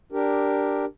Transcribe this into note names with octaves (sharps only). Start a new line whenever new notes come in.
D4 G4 A#4